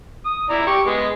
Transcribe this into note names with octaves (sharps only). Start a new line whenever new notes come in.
D#6
E4 D5 A#5
G4 C#6
G#3 B3